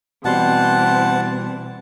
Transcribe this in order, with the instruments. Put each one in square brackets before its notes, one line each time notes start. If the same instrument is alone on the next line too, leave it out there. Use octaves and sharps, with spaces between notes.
[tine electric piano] B2 G3 C6 [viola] E3 C4 [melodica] F#5 A5